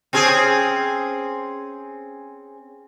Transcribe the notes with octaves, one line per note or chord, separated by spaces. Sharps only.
C4 C#4 G#4